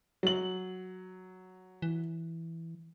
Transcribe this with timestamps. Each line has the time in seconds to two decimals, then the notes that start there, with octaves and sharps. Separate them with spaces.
0.23 F#3 F#7
1.82 E3